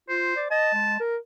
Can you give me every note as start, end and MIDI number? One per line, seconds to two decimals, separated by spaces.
0.09 0.34 65
0.09 0.45 72
0.36 0.50 74
0.51 0.75 75
0.51 0.97 81
0.75 0.97 56
1.00 1.17 70